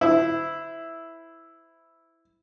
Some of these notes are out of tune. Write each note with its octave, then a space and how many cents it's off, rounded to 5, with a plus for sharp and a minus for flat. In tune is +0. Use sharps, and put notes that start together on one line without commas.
E4 +0 C5 -35